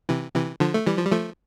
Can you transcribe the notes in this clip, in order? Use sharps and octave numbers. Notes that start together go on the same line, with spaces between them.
C3 E3
C3 E3
D3 F3
A3
E3 G3
F3
G3
F3 A3